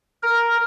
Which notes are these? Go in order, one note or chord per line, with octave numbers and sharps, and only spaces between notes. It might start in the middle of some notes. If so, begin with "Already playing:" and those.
A#4